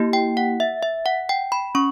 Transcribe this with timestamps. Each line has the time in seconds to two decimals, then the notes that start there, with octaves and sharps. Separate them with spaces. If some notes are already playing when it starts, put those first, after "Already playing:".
Already playing: A#3 E4 G4
0.13 G5
0.37 F#5
0.60 E5
0.83 E5
1.06 F#5
1.29 G5
1.52 B5
1.75 C#4 C#6